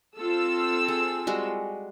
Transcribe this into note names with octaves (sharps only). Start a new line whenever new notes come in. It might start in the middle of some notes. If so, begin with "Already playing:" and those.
C4 F4 A4 E6
G#4
G3 G#3 F#4